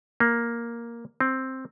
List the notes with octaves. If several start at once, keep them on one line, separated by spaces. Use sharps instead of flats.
A#3
C4